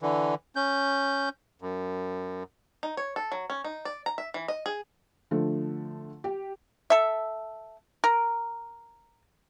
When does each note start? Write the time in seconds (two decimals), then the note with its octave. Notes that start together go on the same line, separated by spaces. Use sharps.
0.02 D3 E3
0.56 C#4 G6
1.62 F#2
2.83 D#4
2.97 C#5
3.16 A4
3.32 F#3
3.50 C#4
3.64 D#4
3.85 D5
4.06 A#5
4.18 E5
4.34 E3
4.48 D#5
4.66 G#4
5.31 D3 F3 A3
6.24 G4
6.90 A4 E5
8.04 A#4